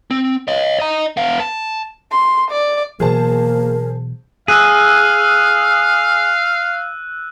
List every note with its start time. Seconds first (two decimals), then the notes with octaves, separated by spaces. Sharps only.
0.11 C4
0.48 C#5 D#5
0.80 D#5 A#5
1.17 B3 F5
1.40 A5
2.12 C6
2.51 D5
3.00 B2 E3 F#3 A#3 G#4 A#4 C5 A5
4.48 G#4 F5 E6 F#6 D#7